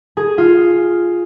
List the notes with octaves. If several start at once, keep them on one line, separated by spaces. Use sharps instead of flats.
G#4
F4